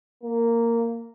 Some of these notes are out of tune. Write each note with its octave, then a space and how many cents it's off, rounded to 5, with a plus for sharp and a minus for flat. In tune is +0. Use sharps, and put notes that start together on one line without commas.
A#3 -10